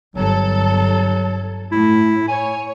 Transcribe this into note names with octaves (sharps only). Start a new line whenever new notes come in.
G1 F#3 A4
A2 E4
C#5 G#5